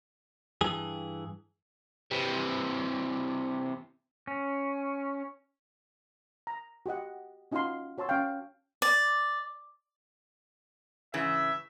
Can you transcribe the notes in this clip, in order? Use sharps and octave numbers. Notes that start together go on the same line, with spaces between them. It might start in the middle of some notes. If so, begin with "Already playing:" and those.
G2 E3 G#4
C3 E3
C#4
A#5
F#4 G4 D#5 F#5
C#4 D#4 F4 F#4 F5 C6
F#4 C#5 A5 C6 E6
C#4 C#5 F5 G5
D5
G#2 C#3 E3 E5